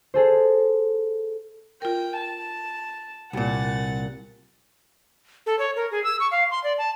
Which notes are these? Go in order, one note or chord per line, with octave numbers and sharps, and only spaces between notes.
G#4 A4 C5
F4 A#4 G5
A5
C2 A#2 F#5 A6
A4
C#5
A#4
G#4
E6
C#6
F5
C6
D5
A5